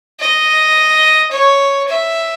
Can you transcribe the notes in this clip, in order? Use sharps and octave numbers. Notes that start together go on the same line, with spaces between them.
D#5
C#5
E5